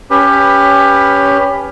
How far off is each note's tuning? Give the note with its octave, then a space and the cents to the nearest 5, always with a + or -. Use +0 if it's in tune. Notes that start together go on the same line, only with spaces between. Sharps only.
C#4 +15 G4 +20 B4 +0